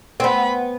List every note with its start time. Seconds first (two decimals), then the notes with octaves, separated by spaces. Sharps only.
0.20 C4
0.24 B3 B5